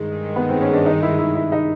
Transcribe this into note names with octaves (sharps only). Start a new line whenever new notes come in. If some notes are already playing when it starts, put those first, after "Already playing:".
Already playing: G2 D#3 G#3
B3
C4
C#4
D4
D#4
E4
E4
E4
D#4